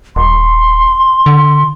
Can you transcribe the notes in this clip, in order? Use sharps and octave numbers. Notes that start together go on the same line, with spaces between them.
D#1 C6
D3